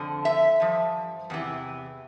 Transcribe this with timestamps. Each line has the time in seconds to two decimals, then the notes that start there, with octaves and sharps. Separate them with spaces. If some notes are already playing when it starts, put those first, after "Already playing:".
Already playing: F2 D3 F3
0.25 E5
0.60 G2 F3
1.30 E2 C3 E3